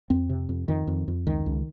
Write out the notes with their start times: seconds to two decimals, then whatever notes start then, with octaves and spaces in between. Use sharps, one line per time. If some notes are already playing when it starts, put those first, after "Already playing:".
0.10 F2 C4
0.29 C3
0.49 F2
0.68 F2 D#3
0.87 F2
1.08 F2
1.27 C#2 D#3
1.46 C#2